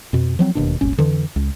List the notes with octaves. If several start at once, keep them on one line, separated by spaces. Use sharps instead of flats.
F2 B2
F3 F#3 C4
E1 D#2 B2 D4
D#1 G#1 C#4
F2 D3 E3
C#2